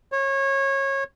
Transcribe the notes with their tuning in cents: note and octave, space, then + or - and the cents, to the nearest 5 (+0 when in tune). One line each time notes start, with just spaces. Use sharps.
C#5 -25